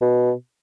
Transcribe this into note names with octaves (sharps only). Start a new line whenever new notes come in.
B2